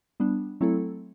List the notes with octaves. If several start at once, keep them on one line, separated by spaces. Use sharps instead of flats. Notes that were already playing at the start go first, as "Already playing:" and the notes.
G3 B3 D4
F#3 A3 C4 E4 A4